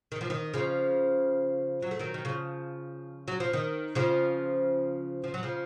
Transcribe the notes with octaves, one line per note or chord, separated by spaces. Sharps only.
D#3
F3
D#3
C#3 F3
F#3
A3
D#3 F#3
D#3
C#3 F3
F#3
F3
D#3
C#3 F3
F3
F#3
C#3 F3